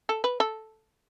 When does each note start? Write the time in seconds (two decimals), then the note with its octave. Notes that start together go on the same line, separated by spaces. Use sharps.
0.09 A4
0.24 B4
0.40 A4